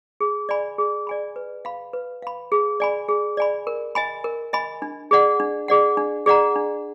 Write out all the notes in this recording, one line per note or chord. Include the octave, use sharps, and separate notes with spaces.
G#4
D5 G#5 B5
G#4
D5 G#5 B5
B4
F5 B5
B4
F5 B5
G#4
D5 G#5 B5
G#4
D5 G#5 B5
A#4
D#5 G#5 B5
A#4
D#5 G#5 B5
D4
G#4 D5 F#5
D4
G#4 D5 F#5
D4
G#4 D5 F#5 A#5
D4